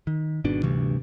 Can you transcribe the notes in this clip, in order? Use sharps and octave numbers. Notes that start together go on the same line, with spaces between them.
D#3
G#1 G#2 B2 D4
D2 G2 C3 E3